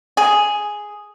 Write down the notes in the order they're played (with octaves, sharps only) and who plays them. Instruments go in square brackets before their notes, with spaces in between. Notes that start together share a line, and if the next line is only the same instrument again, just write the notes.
[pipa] G#4